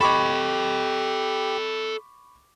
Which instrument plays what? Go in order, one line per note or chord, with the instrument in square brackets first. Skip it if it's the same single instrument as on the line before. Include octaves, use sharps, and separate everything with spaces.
[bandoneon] G4 [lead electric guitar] A4 D#5 [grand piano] B5 C#6 D6